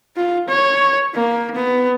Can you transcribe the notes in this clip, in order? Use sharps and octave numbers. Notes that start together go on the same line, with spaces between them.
F4
C#5
A#3
B3